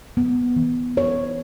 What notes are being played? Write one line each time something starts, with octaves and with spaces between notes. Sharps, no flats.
B3
E3
C#5